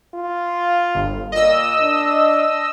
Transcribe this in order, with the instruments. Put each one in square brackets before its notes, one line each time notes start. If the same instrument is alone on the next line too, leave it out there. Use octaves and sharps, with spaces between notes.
[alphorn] F4
[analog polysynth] G1
[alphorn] A#2 [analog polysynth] D#5 E6
[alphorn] D4